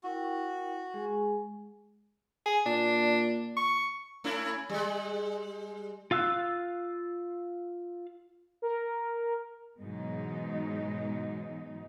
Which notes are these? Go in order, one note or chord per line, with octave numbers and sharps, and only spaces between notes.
E4 F#4 A#4 G5
G#3 G#4 G#5
G#4
A#2 D4
C#6
A3 C#4 E4
G3 G#3
F4 F5 E6 F#6
A#4
G#2 B2 E3 F#3 G#3 D#4